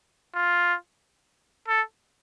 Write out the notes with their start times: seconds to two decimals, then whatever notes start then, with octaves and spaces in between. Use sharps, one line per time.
0.35 F4
1.68 A4